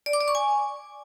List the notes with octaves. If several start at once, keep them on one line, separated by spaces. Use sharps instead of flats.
D5
D6
D5
C#6
G#5